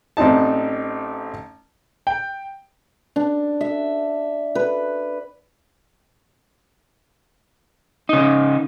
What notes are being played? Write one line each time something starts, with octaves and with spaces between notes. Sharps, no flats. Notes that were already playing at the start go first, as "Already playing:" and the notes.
A1 C4 D4 D#4 A5
G5
D4
E5
B4
C#3 D#4